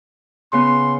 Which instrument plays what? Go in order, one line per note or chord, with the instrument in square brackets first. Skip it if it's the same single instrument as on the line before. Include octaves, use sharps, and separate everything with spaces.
[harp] C#3 B3 [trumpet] C6